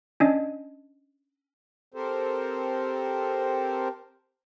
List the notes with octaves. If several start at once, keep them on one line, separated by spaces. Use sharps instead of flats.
C#4 D4 D#5
C4 G4 A4 A#4 C5